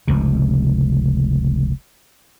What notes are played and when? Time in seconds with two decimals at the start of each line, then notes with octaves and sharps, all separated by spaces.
0.08 F1 C#2 C3